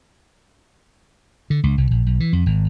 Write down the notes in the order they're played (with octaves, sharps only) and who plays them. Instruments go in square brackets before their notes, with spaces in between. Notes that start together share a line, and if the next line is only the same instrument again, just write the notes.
[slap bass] D3
C#2
C2
A#1
B1
E3
F2
G#1